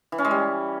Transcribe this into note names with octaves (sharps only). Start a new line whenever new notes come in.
E3
C#4
G#3
G3